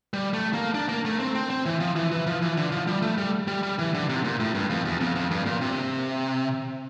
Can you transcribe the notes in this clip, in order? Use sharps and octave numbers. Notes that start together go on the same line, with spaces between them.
G3
A3
A#3
D4
A#3
A3
C4
C4
C4
E3
F3
E3
E3
F3
E3
D3
F3
G3
A3
G3
G3
G3
E3
D3
C3
A#2
A2
G2
F2
E2
F2
F2
G2
A#2
C3